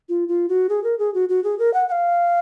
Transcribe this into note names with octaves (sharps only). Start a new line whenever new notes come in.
F4
F4
F#4
G#4
A#4
G#4
F#4
F#4
G#4
A#4
F#5
F#5
F5